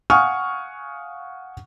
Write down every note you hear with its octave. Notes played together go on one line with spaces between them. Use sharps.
F5 F#5 G#5 C#6 D#6 F6